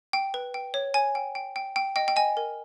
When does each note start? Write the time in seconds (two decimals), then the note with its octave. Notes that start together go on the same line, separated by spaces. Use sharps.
0.13 G5
0.34 B4
0.54 G5
0.74 C#5
0.94 C#5 G#5
1.15 G5
1.35 G5
1.56 G5
1.76 G5
1.96 D#5 G5
2.08 G5
2.16 D#5 G#5
2.37 A#4